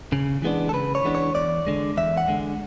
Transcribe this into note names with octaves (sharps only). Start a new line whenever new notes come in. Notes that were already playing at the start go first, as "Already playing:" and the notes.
C#3
E3 G#3 B3 D4
A4
C#3 B4
C#5
E3 G#3 B3 D4
C#5
E2 D5
D3 G#3
E2 E5
F#5
D3 G#3